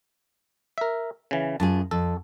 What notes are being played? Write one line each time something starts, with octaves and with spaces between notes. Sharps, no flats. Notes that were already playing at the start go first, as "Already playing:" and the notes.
A#4 E5
C#3 E3
F#2 F4 G#4 A5
F2 A4